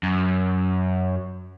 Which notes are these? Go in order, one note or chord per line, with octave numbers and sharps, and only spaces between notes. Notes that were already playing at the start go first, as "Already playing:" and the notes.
F#2